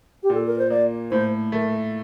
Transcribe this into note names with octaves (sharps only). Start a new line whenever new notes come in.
G4
A#2 A4
A#4
C5
A#3 D5
A2 C5
A3 A#4